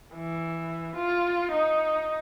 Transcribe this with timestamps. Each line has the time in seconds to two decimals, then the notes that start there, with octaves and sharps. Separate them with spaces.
0.15 E3
0.96 F4
1.52 D#4